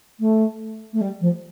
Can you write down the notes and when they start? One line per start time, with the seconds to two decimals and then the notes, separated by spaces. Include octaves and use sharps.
0.19 A3
0.93 A3
1.00 G3
1.20 F3